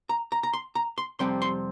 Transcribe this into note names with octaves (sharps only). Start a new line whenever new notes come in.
A#5
A#5
A#5
C6
A#5
C6
F2 C3 G3 C4 C6
C6